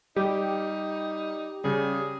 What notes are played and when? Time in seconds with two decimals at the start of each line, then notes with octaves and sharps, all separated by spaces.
0.16 G3 D#4 G4
1.64 C#3 G3 G#4